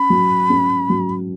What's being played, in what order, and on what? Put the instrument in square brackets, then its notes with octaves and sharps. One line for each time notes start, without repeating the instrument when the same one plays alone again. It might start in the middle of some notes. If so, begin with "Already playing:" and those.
Already playing: [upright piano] C#4 [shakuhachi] B5
[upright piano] F#3
C#4
F#3